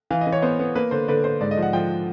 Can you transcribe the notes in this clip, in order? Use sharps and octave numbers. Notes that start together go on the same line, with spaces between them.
E3 F5
D#5
E3
C#5
B3 C5
B3
A#3 B4
D3 C5
D3 B4
D3 C5
G#2 D5
D#5
F3
F#5
F3 G5